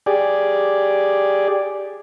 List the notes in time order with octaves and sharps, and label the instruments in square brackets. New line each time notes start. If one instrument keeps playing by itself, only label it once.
[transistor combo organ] G4 G#4 D5